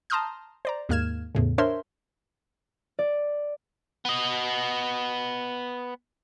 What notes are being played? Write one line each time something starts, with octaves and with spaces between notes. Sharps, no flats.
A5 A#5 C6 D#6 F6 G6
C5 D5 A#5
D#2 G#2 A#3 F6 G#6 E7
E2 A2 C#3
D4 A#4 C5 C#5 E5 C6
D5
B3 D#5